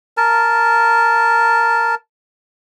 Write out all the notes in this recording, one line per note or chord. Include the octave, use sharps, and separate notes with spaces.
A#4 A5